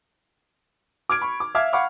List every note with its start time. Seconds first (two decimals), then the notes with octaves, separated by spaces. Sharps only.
1.09 D6 F6 G#6 D7
1.22 B5 C#6
1.40 D6
1.55 E5 F5 D6 F6 G#6
1.73 F5 F#5 B5 C#6 D6 F6